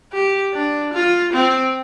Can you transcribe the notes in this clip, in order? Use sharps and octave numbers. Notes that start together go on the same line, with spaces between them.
G4
D4
F4
C4